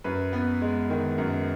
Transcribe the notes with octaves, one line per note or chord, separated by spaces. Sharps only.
F#2 B4
B3
G#3
D#3
F#2